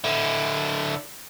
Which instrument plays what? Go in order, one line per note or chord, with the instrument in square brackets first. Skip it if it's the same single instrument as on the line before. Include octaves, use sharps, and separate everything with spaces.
[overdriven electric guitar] D3 E4